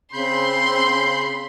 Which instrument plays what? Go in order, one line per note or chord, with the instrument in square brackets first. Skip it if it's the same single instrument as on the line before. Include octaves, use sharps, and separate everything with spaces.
[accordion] C#3 B5 G6 [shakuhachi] C4 [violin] C6